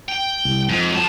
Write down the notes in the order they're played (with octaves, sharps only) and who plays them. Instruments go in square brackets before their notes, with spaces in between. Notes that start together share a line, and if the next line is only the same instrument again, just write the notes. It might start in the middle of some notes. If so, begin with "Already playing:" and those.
[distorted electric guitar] G5
[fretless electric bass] C2
[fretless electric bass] F2 [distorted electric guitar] G#2
[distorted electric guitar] F#3 A5